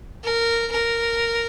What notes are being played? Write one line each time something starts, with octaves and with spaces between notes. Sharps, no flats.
A#4
A#4